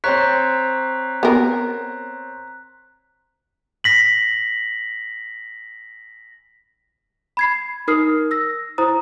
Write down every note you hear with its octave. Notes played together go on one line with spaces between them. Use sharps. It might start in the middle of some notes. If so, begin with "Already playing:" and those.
C4 C5 C#5 A#5 F#6 B6
B3 A#4
A#6 B6 F#7
B5 G#6 C7
D#4 A#4 D#6 F6 C7
E6 A#6
E4 C5 A#5 D#6